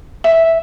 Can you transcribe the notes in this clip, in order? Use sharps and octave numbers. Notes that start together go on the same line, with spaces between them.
E5